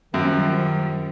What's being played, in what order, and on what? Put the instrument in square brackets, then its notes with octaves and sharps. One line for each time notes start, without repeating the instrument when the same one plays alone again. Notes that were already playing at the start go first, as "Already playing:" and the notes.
[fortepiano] F#2 [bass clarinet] D#3 [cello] F3 G3